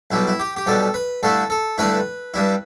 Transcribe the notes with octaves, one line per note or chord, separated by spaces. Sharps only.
B1 B2 G3 E4
E4
G4
G4
B1 B2 G3 A4
B4
G2 D3 A3 E4 A4
A4
G2 D3 A3 E4 B4
G2 G3 E4